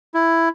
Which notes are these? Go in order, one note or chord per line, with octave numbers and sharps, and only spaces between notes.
E4